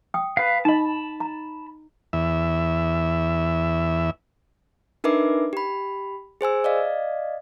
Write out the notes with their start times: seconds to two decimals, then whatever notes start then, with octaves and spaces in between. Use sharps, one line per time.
0.14 G5 D#6
0.37 B4 F5
0.65 D#4 D#5 A5 B5
1.20 A#5
2.13 E2 E5
5.04 D4 D#4 A#4 B4 E5 D6
5.53 G4 B5
6.41 G#4 C5 G#5 E6
6.64 D5 D#5 F5